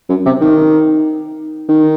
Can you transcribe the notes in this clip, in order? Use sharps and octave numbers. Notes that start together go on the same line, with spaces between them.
F#2
C3
D#3
D#3